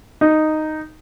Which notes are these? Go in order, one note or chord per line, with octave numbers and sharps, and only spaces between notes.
D#4